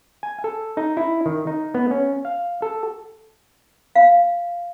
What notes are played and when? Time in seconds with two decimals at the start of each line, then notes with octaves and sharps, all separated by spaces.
0.23 G#5
0.44 A4
0.77 D#4
0.97 E4
1.26 D#3
1.47 D#4
1.75 B3
1.91 C#4
2.25 F5
2.62 A4
3.95 F5